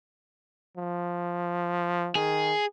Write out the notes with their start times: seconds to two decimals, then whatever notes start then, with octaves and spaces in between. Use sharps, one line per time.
0.77 F3
2.15 D#3 G#4